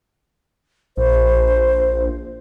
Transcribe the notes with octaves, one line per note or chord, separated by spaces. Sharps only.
A#1 C5